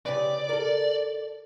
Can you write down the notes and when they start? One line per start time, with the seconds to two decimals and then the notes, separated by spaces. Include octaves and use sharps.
0.06 C#3 G4 B4 D5
0.49 A4 A#4